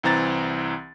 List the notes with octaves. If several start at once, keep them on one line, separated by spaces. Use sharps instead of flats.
C2 E3 C4 A#5 A6